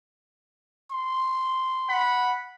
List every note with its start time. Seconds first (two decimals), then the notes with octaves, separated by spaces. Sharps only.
0.91 C6
1.89 F#5 B5